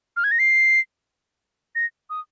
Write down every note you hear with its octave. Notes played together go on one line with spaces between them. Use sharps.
F6
G#6
A#6
C7
A#6
D#6